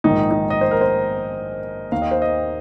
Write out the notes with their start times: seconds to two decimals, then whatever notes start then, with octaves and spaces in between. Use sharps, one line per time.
0.04 A#1 G#2 D#3 D#4
0.31 D#4
0.50 D#5
0.61 C5
0.71 A#4
0.81 C5
1.92 D#2 D#3 F5
2.02 D#5
2.11 C5
2.22 D#5